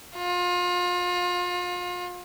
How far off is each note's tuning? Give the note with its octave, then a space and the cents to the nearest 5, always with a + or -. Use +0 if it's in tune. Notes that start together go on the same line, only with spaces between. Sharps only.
F4 +30